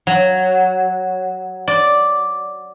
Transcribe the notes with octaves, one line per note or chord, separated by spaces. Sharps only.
F#3
D5